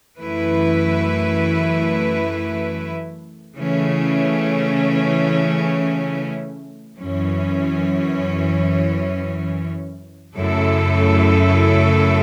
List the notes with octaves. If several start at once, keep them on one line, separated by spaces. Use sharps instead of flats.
F#2 E3 A3 E4 B4
C#3 E3 A3 C#4
F#2 E3 C#4
F#2 C#3 A3 E4 A4